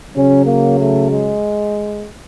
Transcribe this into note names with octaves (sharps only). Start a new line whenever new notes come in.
C#3 F#3 C#4
A#3
A3
G#3